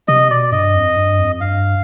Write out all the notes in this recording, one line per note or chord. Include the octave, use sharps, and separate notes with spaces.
C3 D#5
B2 D5
G2 D#5
F2
G2
F2
G2 F5